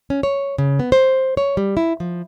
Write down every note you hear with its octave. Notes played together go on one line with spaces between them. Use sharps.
C#4
C#5
C#3
B3
C5
C#5
G3
E4
F3